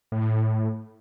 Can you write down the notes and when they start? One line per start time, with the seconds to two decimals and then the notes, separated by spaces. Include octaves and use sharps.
0.12 A2